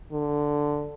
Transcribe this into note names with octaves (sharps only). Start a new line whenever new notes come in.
D3